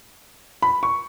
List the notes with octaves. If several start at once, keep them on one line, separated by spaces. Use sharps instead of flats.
B5
C#6